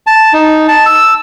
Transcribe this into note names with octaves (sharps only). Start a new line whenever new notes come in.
A5
D#4
A5
E6